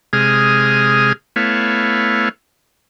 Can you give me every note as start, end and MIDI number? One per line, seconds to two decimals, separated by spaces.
0.13 1.13 48
0.13 1.13 56
0.13 1.13 68
0.13 1.13 87
0.13 1.13 89
1.36 2.29 57
1.36 2.29 59
1.36 2.29 64
1.36 2.29 73
1.36 2.29 77